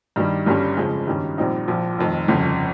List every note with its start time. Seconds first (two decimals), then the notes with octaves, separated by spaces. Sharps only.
0.16 G2 D#3 G3
0.46 G1 G2 G3 C#4
0.77 F2 C#3 F3 G#3
1.07 G2 D#3 G3 C#4
1.38 A#1 A#2 G3 C4 D#4
1.68 A#1 A#2 F3
1.98 F1 F2 D#3
2.28 G1 F2 C#3